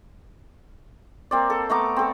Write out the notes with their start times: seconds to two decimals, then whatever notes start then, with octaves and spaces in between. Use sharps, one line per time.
1.31 A#3 C4 D5
1.50 A4
1.70 A3 B3 A#5 D6
1.96 C4 A4